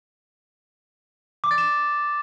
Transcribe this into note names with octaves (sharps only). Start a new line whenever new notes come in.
D6
A6
E7